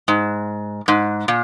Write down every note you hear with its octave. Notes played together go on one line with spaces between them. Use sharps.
G#2
G#2
A#2